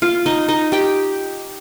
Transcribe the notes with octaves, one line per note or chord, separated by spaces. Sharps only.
F4 F5
D#4 D#5
D#4 D#5
G4 G5